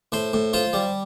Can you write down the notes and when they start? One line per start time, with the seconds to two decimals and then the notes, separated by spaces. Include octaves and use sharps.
0.12 A2 C5
0.33 A2
0.53 F4 C5
0.73 G3